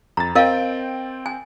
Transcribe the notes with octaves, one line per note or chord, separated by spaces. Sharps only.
F2 A#5 A6
C4 A#4 D#5 F5 G5
G#5